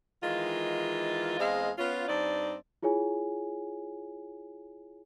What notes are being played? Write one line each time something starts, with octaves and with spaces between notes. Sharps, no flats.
D#3 E3 G#3 F4
E2 G#3 C4 D#5 F5
B3 C#4 F4
G2 C4 D#4 D5
E4 F4 G#4 C#5 G#5